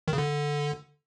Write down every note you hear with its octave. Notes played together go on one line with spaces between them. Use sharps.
D#3
C#3
D3